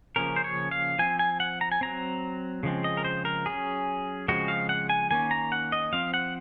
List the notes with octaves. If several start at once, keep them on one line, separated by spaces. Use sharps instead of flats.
C#3 F3 A#3 C#4 A#4
C5
C#5
F5
F3 C4 G#5
G#5
F#5
A#5
G#5
F#3 C4 A#5
C#3 F3 G#3 C4
D#5
A#4
C5
A#4
F#3 C#4 G#4
C#3 F3 G#3 C4 F#4
F5
F#5
G#5
D#3 A#3 C#4 G#5
A#5
F#5
D#5
F3 C4 F5
F#5